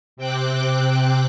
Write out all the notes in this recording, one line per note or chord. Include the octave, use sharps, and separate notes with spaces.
C3 C4 G5 D6 F#6